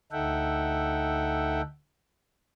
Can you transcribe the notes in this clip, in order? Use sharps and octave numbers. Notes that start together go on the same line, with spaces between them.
D2 D#4 A4 E5 F#5 G5